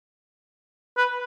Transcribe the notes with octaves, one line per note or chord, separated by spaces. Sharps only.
B4